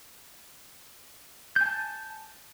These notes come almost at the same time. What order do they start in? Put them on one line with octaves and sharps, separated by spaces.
G6 G#5 A5